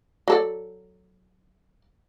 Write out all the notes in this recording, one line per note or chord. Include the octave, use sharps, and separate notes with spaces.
F#3 A4 D5